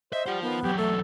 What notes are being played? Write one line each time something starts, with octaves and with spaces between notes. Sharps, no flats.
C5 D#5 E5
G3 F4 C5 F#5
D#3 B3
E2 F#3 G4
A3 A4